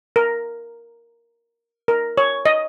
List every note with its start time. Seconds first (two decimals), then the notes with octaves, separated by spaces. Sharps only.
0.16 A#4
1.88 A#4
2.18 C#5
2.46 D#5